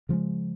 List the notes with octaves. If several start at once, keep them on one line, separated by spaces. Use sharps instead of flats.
C#3 F3 G#3